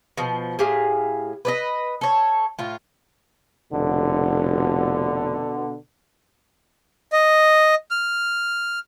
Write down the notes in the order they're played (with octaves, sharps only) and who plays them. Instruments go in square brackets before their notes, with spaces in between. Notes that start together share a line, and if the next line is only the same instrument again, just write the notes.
[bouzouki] B2 F3
A2 G4 G#4 F5
B4 D5 D#5
A4 C#5
A2 F4
[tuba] F1 [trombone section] B2 D3
[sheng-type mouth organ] D#5
F6